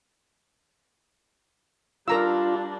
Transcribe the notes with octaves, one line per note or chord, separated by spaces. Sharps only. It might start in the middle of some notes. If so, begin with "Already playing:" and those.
G3 D4 F4 A#4 A#5 E6